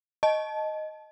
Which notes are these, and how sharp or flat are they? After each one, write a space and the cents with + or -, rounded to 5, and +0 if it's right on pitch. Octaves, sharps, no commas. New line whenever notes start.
D#5 +0 A5 -15